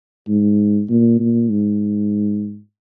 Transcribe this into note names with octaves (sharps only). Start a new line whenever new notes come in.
G#2
A#2
A#2
G#2